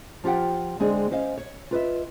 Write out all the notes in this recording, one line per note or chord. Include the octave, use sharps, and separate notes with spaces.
F3 F4 G4 F#5 G5
D3 G#3 C4 D4 G#4
C#4 C5 D#5 F5
C#5
F4 B4 D#5 E5